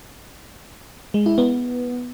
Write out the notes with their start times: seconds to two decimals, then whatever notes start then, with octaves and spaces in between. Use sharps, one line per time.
1.14 G#3
1.26 E4
1.38 B3